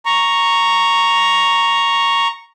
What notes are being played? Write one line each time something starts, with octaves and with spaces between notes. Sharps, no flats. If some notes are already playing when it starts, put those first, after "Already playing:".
A#5 C#6